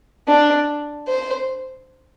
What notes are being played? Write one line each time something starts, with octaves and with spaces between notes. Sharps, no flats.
D4
C5